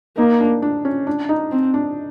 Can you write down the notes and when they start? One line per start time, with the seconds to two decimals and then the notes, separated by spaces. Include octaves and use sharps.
0.17 A#3 D#4
0.40 D4
0.62 D4
0.85 C#4
1.07 D4
1.29 D#4
1.52 C4
1.74 D4